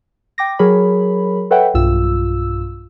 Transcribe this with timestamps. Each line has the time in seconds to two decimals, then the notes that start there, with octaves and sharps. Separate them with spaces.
0.38 G5 D6 A#6
0.59 F#3 G#4 A#4 C#5 B5
1.51 A4 B4 C#5 E5 F#5 G5
1.74 B1 G2 F4 E6